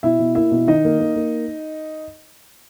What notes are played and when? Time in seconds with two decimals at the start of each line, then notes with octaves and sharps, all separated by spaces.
0.03 B2 E4 E5
0.19 B2
0.35 A#3 E4 E5
0.51 B2
0.68 D#3 D#4 D#5
0.85 A#3
1.00 A#3
1.16 A#3